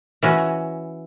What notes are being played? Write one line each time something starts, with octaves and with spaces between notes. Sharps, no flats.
E3 C#4 F#4